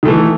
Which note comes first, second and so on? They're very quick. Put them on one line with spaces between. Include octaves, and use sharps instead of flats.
D#3 A3 E3